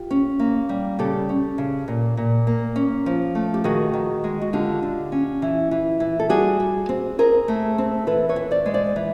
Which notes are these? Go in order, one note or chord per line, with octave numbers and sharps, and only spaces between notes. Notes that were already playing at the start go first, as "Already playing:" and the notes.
Already playing: F4 G4
C#4
A#3
G3
C#3 G4 A4
C#4
C#3
A#2
A#2
A#3
C#4
F3
A3
G4
D#3 F#4 G#4
D#3
G#3
F#4
D3 F4 G4
D3
C#4
E3
E3
E3
A4
G3 F#4 G#4
G3
C4
C4 G#4 A#4
A3
C4
E3 A4 B4
B4 C#5
E3
C5 D5
G#3
C5 D5
E3